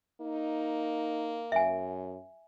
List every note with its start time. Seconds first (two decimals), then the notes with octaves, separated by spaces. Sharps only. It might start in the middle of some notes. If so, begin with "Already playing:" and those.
0.21 A#3 D#4
1.52 F#2 E5 G#5